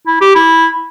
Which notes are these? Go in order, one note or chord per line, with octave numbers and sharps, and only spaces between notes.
E4
G4
E4